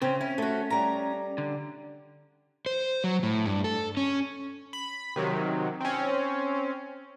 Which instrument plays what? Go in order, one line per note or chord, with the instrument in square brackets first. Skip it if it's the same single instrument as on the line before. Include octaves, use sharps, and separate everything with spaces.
[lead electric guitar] C#3 C#4 [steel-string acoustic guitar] C4
[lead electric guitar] C#4 [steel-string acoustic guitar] E4
[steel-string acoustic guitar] A3 F#4
G3 A#5
[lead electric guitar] D3
[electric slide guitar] C5
F#3
A2
G2
A4
C#4
[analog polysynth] B5
C3 D#3 F#3
C4 C#4